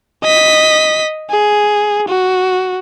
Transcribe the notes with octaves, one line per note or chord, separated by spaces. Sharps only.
D#5 B6
G#4
F#4